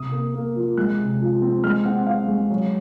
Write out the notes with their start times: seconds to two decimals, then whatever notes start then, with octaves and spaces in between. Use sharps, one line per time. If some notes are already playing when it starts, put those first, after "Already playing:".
Already playing: C3 D#6
0.12 A#3
0.35 A#3
0.56 F3
0.77 G#3 F#6
0.99 C3
1.21 F3
1.42 C4
1.64 G#3 F6
1.85 C4 F#5
2.06 C4 F5
2.28 G#3
2.50 F#3